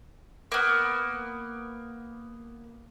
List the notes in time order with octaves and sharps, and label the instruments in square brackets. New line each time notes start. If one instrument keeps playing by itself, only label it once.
[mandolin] A#3 B3